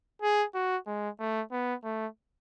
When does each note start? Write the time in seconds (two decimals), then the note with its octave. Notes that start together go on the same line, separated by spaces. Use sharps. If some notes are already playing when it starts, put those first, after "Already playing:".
0.22 G#4
0.54 F#4
0.87 G#3
1.19 A3
1.52 B3
1.84 A3